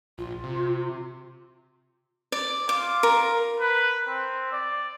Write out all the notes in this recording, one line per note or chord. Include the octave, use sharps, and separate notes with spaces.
A#1 F4
C3
D5
F4 D6
A#4
B4
C4
D5